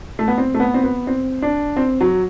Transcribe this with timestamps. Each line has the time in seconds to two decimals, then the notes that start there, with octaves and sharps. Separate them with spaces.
0.19 A3
0.28 B3
0.38 C4
0.54 A3
0.60 B3
0.74 C4
0.84 B3
1.07 C4
1.42 D4
1.77 C4
2.01 F#3